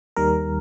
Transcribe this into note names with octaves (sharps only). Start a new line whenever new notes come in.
D#2 D#3 G3 A#4